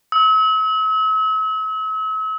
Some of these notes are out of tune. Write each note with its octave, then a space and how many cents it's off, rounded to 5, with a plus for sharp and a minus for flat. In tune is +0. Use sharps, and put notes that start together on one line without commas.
E6 -45